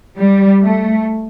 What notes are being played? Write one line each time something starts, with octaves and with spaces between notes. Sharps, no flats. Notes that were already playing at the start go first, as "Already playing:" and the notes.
G3
A3